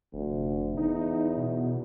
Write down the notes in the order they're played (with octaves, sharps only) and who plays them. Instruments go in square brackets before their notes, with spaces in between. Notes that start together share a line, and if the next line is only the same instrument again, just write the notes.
[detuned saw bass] F1 [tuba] D2
[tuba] E2 [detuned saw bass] D#4
[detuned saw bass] B2